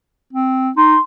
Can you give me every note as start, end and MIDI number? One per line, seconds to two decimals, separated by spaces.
0.33 0.71 60
0.77 0.96 63
0.77 0.99 84